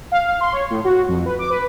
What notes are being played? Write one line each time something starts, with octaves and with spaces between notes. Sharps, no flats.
F5
F5
C6
C#5
A2
F#4
F2
B4
D6
B4